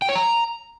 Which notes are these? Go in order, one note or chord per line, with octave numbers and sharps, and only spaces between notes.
G5
C#5
A#5